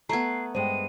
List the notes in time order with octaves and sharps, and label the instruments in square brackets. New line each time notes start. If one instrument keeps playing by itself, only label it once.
[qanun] A3 B3 [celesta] A#5 G#6 [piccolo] C7
[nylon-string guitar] G2 G#3 [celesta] C5 G5 [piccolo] D#7